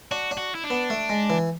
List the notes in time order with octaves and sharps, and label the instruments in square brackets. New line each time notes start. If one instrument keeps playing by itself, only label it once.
[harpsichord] D4 [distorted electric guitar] F#4
[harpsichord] D4
[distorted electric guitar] F#4
E4
D4
[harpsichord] B3
A3
G#3
E3